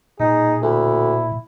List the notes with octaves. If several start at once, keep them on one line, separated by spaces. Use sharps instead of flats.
A#2 D#4 G#4
D2 E4